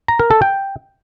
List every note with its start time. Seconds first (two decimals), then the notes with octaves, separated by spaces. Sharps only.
0.08 A#5
0.19 A#4
0.31 A4
0.42 G5